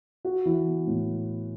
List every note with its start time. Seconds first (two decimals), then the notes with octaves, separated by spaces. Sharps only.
0.25 F#4
0.45 E3
0.67 B3
0.87 A2